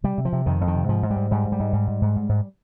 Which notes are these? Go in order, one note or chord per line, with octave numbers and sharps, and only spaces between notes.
C3 G3
C3
F3
C3
F2 D#3
F2
D#3
C3
G#2 F3
G#2
G3
G#2
G#2 G3
G#2
G3
G#2
G#2
G#2
G#2
G#2
G#2